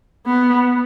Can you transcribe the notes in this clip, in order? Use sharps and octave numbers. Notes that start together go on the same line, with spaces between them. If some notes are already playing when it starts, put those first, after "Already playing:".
B3